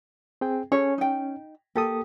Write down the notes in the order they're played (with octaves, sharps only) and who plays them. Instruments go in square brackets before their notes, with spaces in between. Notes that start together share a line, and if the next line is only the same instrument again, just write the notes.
[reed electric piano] C4 G#4 G5
[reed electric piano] C#4 [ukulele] G#4 A4 C#5
[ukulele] D#4 G5
[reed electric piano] A#3 A4 D#6 [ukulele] G4